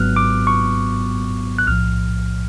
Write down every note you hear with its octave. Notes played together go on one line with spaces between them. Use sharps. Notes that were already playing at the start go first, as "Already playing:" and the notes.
Already playing: G#1 G#2 F#3 B3 F6 F#6
D6
C#6
F#6
B1 A2 F3 F6